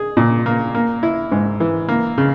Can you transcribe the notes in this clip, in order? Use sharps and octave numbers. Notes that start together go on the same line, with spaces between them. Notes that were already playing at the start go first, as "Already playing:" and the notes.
Already playing: G#4
A#2
A#3
A#3
E4
G#2
E3
A#3
C#3